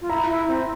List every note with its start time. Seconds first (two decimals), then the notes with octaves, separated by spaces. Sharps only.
0.01 F4
0.10 E4 A#5
0.29 E4
0.48 C4